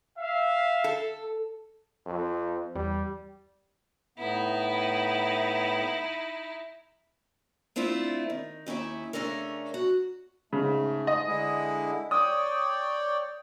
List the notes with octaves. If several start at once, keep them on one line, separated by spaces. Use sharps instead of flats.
E5 F5
A4
F2
E2 G3
A2 B3 D#4 E4
A3 C4 D4 E4 F4
D#3
D#2 C#4 E4 E5 G5
C#3 A3 C#4 D4 A4 A#4
F#4
G#2 C#3 A3
D#5
D3 G#3 E4
C#5 D5 G5 D#6